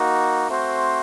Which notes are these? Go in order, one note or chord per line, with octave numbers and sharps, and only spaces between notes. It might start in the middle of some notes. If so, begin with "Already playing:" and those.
Already playing: A#3 D#4 F#4
A3 C4 F#4 C5